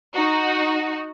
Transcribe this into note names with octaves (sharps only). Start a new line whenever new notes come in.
D#4 F#4